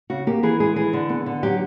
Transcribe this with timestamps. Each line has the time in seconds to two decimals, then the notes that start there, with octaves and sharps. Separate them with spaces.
0.10 C#3 F#4
0.27 A#3 G4
0.43 E3 G#4
0.60 G#3 G#4
0.76 E3 G#4
0.93 D3
1.09 B3
1.26 D3
1.43 F#3 G4